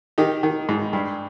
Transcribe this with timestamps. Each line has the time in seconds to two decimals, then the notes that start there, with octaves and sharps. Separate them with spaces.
0.18 D#3 D#4 G4
0.43 D#3
0.69 G#2
0.93 G2